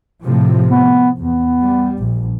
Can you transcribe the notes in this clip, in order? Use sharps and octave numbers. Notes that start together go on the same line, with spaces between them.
A2 C3 F3
B3
E2 B3
G3
A#1